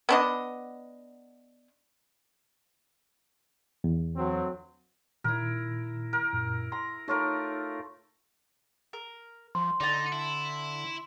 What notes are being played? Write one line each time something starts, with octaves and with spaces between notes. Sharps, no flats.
B3 D4 D#5
E2
D2 F#3 C4
A#2 D#3 E4 A#4
A#4
F#2 A#2
A#5 C6
A3 D#4 F4 A#4 C#5
A#4
F3 C6
D3 D#4 D5 A5
E4